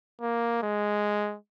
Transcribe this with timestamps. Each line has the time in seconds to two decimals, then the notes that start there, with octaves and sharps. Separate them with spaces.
0.21 A#3
0.62 G#3